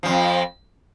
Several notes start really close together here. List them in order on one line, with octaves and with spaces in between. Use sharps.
F3 G#2 F2